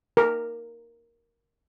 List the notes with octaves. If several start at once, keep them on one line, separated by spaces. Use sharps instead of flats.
A#4